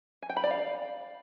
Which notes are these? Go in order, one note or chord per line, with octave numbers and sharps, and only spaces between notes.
G#5
G5
B5
D5
F5